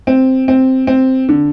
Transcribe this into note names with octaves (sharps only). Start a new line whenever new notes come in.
C4
C4
C4
D3